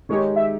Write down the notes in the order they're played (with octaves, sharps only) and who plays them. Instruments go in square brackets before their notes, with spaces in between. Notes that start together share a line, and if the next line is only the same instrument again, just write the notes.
[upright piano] D#3 G#3 D#4 G4 [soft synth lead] C#5
[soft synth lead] E5